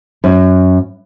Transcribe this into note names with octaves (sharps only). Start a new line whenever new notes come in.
F#2